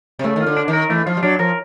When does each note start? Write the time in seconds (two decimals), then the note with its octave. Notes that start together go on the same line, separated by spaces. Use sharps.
0.19 C3
0.24 C#3 A3
0.36 D#3 F4
0.46 D3
0.57 D4
0.68 D#3
0.73 A#4
0.90 E3 A3
1.06 F3 F4
1.17 G3
1.23 F#3 D4
1.39 F3 A#4